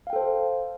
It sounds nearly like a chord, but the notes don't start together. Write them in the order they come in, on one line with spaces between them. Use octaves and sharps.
F5 G5 A4 C5